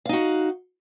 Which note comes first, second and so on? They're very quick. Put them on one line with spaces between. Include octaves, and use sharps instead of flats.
F5 D#4 F#4